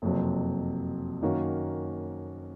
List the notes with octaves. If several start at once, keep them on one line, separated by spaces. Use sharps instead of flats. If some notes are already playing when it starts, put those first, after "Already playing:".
F#1 F2 C3 F#3
F#2 D#3 A#3 C#4 F#4